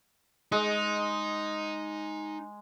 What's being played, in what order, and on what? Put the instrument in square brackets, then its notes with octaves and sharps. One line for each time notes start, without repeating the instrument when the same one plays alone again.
[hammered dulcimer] G#3 [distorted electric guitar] D#4